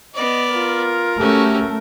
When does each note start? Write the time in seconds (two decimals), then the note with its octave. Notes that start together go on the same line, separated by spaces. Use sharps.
0.14 B3 D5 D#5
0.54 F4 A#4
1.20 A3 C#4 F#4 G4